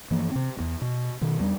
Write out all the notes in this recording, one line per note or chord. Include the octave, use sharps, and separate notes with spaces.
G2 E3 F3 A#3
C3 C4
E1 E2
B2
B2 D#3
E2 G3 D4